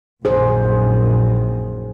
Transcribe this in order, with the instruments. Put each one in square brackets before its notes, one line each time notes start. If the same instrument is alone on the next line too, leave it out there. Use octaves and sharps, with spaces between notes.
[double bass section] A#1 F#2 D#3 [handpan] G#4 C5